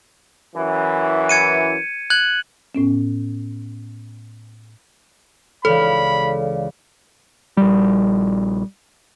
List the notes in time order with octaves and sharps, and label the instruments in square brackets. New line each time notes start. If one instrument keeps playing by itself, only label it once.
[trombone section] F#2 E3
[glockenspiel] G#6 C#7 D#7
F#6 G#6 F#7
[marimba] A2 B3 C#4
[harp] C#2 E3 [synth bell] A4 [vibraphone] C#5 D5 F5 [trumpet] B5
[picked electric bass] A#1 G3